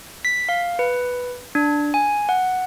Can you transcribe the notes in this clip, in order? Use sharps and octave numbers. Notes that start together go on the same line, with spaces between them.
B6
F5
B4
D4
G#5
F#5